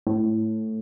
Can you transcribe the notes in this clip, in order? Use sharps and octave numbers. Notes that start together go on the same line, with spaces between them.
A2